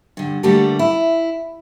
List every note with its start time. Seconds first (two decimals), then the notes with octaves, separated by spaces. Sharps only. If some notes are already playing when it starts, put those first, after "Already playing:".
0.17 G2 D3
0.43 D3 G3 A3 A#3 G4 A4
0.79 E4